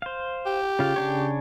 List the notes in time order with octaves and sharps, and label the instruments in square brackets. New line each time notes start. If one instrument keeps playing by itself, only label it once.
[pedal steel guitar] C5 F5
[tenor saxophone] G4
[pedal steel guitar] C#3 F4 F5
C#3 D4 C#5